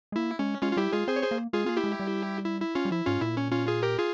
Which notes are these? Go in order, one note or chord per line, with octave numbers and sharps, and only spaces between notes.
G#3
A#3 E4
G#3 C#4
G#3 C#4 F4
F4
G3 E4 G4
G#3 F4 G#4
C4 G#4 C5
C#5
G#4 C5
A#3
G#3 F4 G#4
A#3 C4 F4
E4 G4
G#3
G3
E4
E4
C#4 F4
G3
F3 E4
G#2 C#4 F4
A#2 E4
C#4
C#4 F4
F4 G#4
G4 A#4
F4 G#4